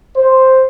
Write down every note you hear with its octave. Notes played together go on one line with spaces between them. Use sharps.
C5